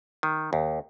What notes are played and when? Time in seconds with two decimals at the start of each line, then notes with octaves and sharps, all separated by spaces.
0.23 D#3
0.53 D#2